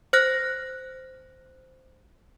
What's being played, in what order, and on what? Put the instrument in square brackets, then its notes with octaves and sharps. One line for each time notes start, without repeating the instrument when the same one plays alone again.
[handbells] C5 F6 F#6 A#6